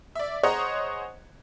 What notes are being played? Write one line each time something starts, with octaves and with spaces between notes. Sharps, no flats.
D5 E5
G#4 C5 C#5 D#5 F#5 A#5